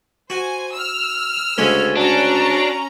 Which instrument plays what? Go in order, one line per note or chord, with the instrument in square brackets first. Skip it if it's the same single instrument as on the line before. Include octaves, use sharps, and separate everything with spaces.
[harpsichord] F#4 [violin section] C5 G#5
[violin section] E6 F6
[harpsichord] D2 C#3 G#3 [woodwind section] A4 G#5
[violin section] C#4 A#5 [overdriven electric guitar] D4 [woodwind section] F#4